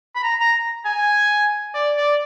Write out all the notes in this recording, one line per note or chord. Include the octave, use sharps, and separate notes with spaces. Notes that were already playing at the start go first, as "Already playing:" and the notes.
B5
A#5
A#5
G#5
D5
D5